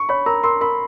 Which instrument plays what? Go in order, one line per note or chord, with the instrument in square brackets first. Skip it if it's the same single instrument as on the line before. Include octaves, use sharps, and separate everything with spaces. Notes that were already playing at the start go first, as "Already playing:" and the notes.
Already playing: [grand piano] C#6
[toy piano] C#5 [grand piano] B5
[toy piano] A#4 [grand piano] A#5
[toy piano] A#4 [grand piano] C6
[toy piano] A#4 [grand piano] B5